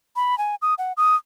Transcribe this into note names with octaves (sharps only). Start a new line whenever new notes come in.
B5
G#5
D#6
F#5
D#6